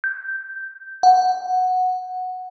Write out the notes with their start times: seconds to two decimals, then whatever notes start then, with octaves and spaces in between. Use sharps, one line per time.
0.04 G6
1.03 F#5